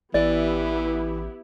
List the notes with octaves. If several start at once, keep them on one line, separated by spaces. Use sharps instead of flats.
A1 E3 B3 E4 G4 D5